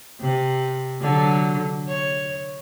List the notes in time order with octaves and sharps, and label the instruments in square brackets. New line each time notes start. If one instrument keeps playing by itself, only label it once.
[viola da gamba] C3
D3 F#3
C#5